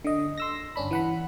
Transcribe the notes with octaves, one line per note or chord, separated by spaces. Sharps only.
D3 D#5
C6 E6 A#6
G1 C#4 D4 B5
E3 F#5 B5